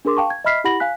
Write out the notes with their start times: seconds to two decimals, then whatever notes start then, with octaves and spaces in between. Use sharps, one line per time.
0.05 D4 G#4 A#4 C6 D6
0.17 F5 G5 A5 C#6
0.30 G#6
0.45 D#5 E5 B5 F6 B6 C7
0.64 E4 G4 F#5 B5 A#6 F#7
0.80 F5 G#5 F#6 B6